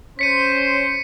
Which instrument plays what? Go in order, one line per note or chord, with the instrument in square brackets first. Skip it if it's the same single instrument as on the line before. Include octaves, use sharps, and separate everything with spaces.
[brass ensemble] C#4 C5 [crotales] B6 C#7 D#7